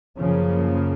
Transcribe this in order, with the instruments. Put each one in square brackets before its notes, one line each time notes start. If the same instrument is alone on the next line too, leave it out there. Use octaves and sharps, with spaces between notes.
[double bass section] F#2 C#3 F3 A#3